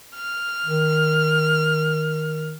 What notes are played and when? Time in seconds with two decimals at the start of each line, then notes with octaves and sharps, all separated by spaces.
0.16 F6
0.66 D#3